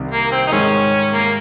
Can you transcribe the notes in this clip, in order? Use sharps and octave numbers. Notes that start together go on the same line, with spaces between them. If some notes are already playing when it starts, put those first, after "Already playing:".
Already playing: C2 C3 D#3
A#3
C4
D#4
G#2 D#3 G#3 C#4
A#3